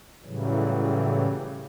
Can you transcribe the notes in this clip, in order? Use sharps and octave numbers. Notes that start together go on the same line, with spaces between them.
A2 C#3 E3 F#3 G3